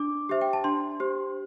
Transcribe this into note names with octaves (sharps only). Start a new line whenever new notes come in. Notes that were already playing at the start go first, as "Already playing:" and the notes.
Already playing: D4 D6
G4 C5 E5
G5
A5
D4 C6
G4 C5